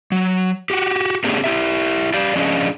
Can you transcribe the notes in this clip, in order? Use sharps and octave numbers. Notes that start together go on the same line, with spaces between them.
F#3
F#4 G4
A3 B3 C#4 D4 G4 G#4
E4 G4 E5
G4 D5 F5
F3 C#4 D4 F4 G#4 D#5